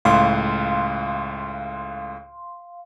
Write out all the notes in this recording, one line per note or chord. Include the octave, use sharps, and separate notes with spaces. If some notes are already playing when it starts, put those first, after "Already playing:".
C#2 A2 F5 C6